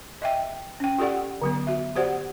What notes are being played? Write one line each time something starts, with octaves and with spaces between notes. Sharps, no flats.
D#5 E5 G5
C#4 G5
F4 G4 A4 D5 F#5
D3 F#3 B3
F#4 E5
F#4 G4 C5 D5 F#5